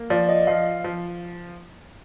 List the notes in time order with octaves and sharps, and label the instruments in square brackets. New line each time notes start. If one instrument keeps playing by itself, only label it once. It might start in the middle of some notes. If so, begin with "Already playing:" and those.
Already playing: [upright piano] A#3
[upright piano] F3 [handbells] D5
[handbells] D#5
[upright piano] F3 [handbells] F5
[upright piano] F3